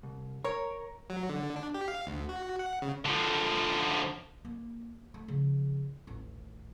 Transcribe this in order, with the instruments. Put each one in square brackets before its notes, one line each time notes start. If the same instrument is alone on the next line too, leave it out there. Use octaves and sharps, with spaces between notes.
[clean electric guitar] C2
[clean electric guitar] A#4 [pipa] C#5
[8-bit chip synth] F#3
D3
D4
G4
F5
D2
F#4
F#5
C#3
[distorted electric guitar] D3 F3
[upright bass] A#3
A3
C#3 F3
D#1 A1